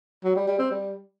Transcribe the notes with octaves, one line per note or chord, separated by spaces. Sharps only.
F#3
G3
G3
C4
G3